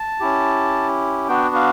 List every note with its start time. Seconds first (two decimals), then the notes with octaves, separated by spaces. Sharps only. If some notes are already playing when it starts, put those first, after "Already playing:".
Already playing: A5
0.20 C#4 E4 G4
1.28 B3 D4 F#4 G5
1.55 F5